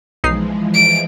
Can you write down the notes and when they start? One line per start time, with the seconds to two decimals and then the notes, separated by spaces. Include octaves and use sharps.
0.24 B1 E3 F3 G#3 D#4 C7
0.74 D7